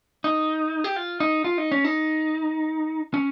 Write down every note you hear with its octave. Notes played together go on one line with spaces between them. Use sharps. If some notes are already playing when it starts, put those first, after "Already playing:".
D#4
G4
F4
D#4
F4
D#4
C#4
D#4
C#4